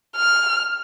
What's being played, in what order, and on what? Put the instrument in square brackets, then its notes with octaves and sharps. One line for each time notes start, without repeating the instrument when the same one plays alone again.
[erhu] F6